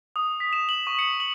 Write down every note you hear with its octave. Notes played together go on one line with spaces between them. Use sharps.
D#6
B6
E7
F#7
C#6
C#7
F#7